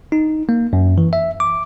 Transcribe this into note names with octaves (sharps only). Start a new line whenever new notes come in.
D#4
A#3
F#2
E3
E5
D6